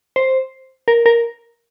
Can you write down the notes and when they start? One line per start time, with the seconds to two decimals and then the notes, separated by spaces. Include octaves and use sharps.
0.16 C5
0.88 A#4
1.06 A#4